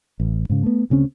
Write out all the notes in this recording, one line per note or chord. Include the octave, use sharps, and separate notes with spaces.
A1
G#2 C#3
A3 B3
D2 C#3 C4 C#4